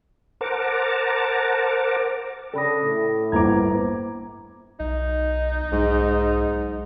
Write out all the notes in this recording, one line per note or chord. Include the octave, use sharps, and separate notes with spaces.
A#4 C5 F#5 A5 A#5 D6
C#3 D4 A4 D5 G5 B5 D#6 A#6
A2
G1 A#3 B3 E4 C5 A#5 D6 G#6
B1 D#4
B1 G#2